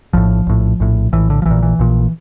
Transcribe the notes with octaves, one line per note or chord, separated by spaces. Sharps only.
A#1 A2 F3
A#1 A2
A#1 A2
A#1 A2 E3
D3
F3
A#1 E3
A#2
E3
A#1 A#2